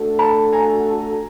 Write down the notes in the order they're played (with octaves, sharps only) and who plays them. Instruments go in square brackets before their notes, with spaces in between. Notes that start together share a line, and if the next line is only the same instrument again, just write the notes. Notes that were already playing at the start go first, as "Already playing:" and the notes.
Already playing: [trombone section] A3 D4 F#4 A4
[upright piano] A5 B5
G#5 A#5